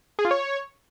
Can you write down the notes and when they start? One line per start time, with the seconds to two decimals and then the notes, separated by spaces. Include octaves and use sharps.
0.19 G#4
0.25 F4
0.31 C#5